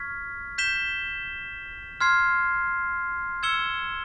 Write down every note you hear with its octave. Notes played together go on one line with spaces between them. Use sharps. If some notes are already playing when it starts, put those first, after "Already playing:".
Already playing: C#6 F6 G#6 B6
G6 B6 E7 G7
C6 F6 G#6 C7
E6 G#6 C#7 E7 G7